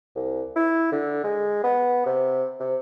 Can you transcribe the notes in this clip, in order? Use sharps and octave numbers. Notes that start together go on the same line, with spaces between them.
C2
E4
D3
G#3
B3
C3
C3